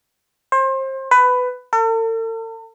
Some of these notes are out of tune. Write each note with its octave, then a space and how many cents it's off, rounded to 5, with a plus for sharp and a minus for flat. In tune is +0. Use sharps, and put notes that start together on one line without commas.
C5 +30
B4 +15
A4 +45